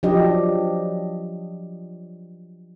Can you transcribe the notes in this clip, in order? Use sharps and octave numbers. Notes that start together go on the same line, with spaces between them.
F3 F#3 D4 G4 D#5